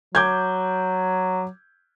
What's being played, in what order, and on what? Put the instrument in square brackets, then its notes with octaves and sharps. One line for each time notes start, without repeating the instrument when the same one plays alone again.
[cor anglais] F#3 [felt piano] D6 G6 G#6